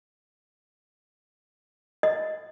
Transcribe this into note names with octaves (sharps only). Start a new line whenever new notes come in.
D#5